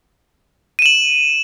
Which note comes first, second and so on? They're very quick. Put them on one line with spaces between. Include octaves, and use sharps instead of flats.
D#7 E7 F#7